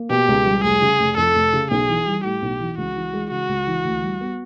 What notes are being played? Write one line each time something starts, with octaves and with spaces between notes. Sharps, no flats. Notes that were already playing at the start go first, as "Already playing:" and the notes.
Already playing: A#3
B2 G4
C#2
G3
F1 G#4
C#3
F1
F2 A4
F1
C#3
B1 G#4
E3
G3
A2 G4
B1
E3
C#2 F#4
E3
G#3
C#3 F#4
C#2
E3
D2
G3
B3